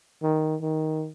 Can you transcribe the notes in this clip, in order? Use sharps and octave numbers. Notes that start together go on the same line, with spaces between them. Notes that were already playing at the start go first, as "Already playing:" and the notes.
D#3
D#3